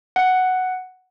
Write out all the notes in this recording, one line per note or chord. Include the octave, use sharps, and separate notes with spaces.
F#5